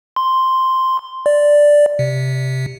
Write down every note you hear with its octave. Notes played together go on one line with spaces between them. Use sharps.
C6
D5
C3